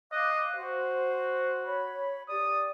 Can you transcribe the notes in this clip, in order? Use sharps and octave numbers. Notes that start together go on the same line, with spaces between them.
D#5 F5 D6 F#6
F#4 C5
C#5 B5
G4 D5 D#6